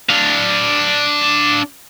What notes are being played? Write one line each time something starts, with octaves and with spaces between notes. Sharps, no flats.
D4 F5